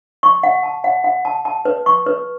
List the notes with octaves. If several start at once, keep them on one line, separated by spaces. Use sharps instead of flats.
C#6
F#5
A5
F#5
F#5
A5
A5
B4
C#6
B4